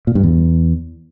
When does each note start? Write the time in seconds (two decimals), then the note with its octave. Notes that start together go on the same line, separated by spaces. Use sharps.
0.07 A#2
0.15 G2
0.23 E2